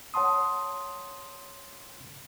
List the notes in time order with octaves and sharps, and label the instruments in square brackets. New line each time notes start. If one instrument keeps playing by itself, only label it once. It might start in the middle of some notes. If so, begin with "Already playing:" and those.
[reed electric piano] C#5 F#5 A5 C6 D#6